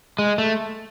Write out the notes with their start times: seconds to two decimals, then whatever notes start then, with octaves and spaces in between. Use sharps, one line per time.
0.19 G#3
0.38 A3